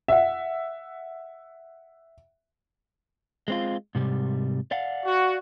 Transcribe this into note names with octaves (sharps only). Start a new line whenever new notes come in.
E5 F#5
G#3 C4 F4
G#2 C3 G3
D5 F5 F#5
F#4